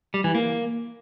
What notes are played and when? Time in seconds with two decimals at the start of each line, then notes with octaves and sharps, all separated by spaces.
0.14 G3
0.24 E3
0.35 A#3